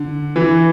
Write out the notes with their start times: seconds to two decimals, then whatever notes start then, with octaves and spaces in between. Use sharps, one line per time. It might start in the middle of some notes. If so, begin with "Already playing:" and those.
Already playing: D3
0.36 E3